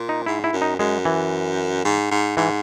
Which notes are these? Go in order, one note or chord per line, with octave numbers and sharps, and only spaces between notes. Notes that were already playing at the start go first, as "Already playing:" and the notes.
Already playing: A#2
D#4
G#2 E4
E4
F#2
D#4
F#2 G#3
E3
G#2
G#2
G#2 E3